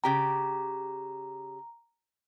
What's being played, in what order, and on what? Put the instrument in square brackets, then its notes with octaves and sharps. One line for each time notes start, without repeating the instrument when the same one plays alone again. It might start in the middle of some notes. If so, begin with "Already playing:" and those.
[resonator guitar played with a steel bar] C#3 G4 G5 [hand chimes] A#5